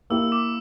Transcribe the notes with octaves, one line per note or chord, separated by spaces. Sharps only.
A#3 E4 G4 E6
D6